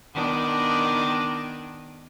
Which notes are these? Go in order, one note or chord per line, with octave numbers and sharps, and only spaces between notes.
D#3 B3 D4